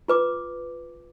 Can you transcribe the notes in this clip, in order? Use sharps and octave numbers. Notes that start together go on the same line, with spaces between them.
F4 B4 D6